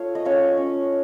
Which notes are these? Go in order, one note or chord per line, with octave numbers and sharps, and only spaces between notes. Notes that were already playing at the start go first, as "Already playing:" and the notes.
Already playing: A3 F4 C#5
D#5
C#4 C#5 F5
C#4